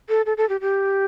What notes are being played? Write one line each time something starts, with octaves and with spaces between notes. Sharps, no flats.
A4
A4
A4
G4
G4